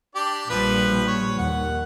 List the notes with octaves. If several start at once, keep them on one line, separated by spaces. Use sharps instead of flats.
D4 G4 D5
A#1 F3 G3 B4
C#5
D#2 F#5